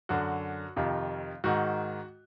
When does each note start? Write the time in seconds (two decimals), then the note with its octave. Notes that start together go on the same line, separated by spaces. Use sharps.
0.09 F#2 D3 F#4
0.76 F2 C3 D#3 F4
1.44 G#2 D#3 F#4